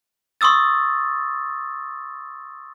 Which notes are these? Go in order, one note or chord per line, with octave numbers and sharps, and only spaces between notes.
C6 C#6 D#6 E6 A6